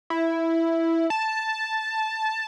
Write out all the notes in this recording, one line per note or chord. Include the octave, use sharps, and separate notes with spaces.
E4
A5